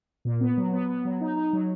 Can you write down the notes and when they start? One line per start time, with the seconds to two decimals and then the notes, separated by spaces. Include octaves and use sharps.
0.25 A#2
0.41 B3
0.58 F#3
0.73 B3
0.89 B3
1.05 F#3
1.21 D#4
1.37 D#4
1.53 F#3